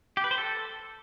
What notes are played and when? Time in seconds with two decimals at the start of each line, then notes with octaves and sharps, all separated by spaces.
0.17 G4
0.24 B4
0.31 C5
0.38 A4